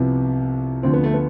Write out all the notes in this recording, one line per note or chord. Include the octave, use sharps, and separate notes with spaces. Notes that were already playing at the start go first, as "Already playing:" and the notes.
Already playing: C2 C3 F3 B3
D2 D3 F3 C4
B3
A3
B3